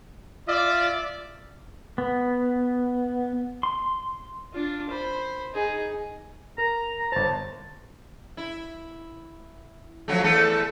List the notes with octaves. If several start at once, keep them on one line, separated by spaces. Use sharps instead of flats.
F4 D5 E5
B3
C6
D4 F4
C5 B5
D#4 G#4
A#4 A#5
A#5
G1 C5 A5
E4
F3 F#3 A3
E2 A3 A4